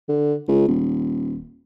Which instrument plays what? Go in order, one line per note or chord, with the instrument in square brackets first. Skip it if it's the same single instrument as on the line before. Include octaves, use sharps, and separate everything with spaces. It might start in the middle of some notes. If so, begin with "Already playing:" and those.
[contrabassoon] D3
C#2
D#1